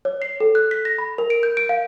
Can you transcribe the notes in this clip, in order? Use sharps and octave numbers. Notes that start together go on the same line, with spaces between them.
C#5
C7
A4
F#6
B6
A#6
B5
A#4
D7
G6
D7
F5